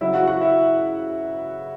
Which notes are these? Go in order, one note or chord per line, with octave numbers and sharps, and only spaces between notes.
C#3 F#3 E4 E5
F#4 F#5
F#4 F#5
E4 E5